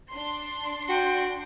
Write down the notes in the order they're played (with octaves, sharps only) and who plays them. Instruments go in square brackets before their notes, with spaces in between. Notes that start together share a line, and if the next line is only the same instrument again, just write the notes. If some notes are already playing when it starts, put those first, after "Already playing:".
[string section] D4 C6
[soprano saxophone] F#4 [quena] G5